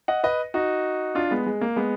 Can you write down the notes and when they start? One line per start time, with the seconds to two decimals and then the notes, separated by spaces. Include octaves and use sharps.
0.08 D#5 F#5
0.24 B4 D#5
0.54 D#4 F#4
1.15 D4 F4
1.31 G#3 B3
1.46 G#3
1.61 A#3
1.76 G#3 B3